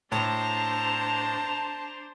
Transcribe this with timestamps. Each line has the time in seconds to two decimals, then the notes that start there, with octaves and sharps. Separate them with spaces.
0.12 A2 D4 C5 A5 A#5